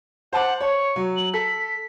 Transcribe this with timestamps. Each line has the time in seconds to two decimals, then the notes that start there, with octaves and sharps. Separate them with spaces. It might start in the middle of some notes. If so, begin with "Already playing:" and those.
0.33 C5 F#5 A5 D6
0.61 C#5 C#6
0.96 F#3
1.16 F#7
1.34 A4 B6